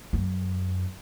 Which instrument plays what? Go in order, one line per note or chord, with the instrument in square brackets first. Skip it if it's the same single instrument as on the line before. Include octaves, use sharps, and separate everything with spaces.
[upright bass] F#2